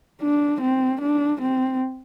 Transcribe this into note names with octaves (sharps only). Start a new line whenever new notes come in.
D4
C4
D4
C4